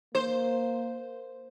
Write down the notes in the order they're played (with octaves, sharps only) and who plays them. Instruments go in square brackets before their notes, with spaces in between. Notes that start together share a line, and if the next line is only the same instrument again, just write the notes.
[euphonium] A#3 [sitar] C5